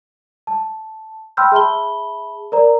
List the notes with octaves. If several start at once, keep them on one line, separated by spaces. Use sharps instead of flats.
A5
G5 B5 C6 E6 F6 G6
G#4 E5 A5 B5 G7
A#4 C5 D5 A#5